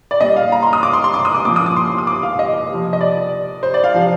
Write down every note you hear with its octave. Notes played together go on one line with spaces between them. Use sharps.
D5
A#2 G3 D#5
F5
A#5
C6
D#6
D6
C6
C6
D6
D#6
D6
A#2 F3 D6
D#6
D6
C6
D#6
D6
F5
D#5
C3 F3
D#5
D5
C5
D5
F5
C3 F3